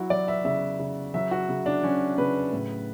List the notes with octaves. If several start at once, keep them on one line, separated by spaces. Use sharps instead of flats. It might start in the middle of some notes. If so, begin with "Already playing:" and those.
Already playing: F#3 E4 F#4
F#3 D5
E5
C#3 E5
C#3
F#3 E5
F#4
C#3
D4
F#3 C#4
C#3 B4
A2